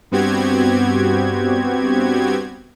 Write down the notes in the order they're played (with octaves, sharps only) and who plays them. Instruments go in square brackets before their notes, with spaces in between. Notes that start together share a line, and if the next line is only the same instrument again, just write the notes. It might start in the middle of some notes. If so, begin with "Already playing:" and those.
[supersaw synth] G2 B3 C4 F#4 G4 G#6